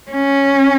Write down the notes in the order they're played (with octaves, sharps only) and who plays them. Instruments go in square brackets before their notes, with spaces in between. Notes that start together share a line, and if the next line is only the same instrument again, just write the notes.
[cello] C#4